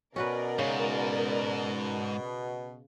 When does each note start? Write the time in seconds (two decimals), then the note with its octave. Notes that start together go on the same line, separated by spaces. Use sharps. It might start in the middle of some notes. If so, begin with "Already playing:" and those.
0.16 B2 C#4 F#4 A#4 B4 D5
0.59 G#2 C#3